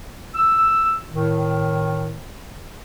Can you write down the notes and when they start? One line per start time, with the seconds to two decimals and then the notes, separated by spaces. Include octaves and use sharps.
0.35 E6
1.11 A2 D#3